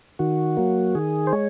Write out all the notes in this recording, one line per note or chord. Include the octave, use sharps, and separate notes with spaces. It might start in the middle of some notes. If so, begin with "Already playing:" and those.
D#3 F#4
F#3 A#3
D#3 G#4
C5
G#3 C#5